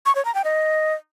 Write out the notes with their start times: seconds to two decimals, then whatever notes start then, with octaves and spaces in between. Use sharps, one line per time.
0.06 C#6
0.15 C#5
0.25 A#5
0.35 G5
0.44 D#5